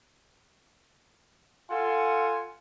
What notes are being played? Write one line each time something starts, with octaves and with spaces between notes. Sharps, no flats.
F4 A4 F#5 G#5